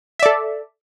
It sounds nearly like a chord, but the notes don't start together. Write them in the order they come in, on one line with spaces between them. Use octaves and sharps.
E5 D5 A4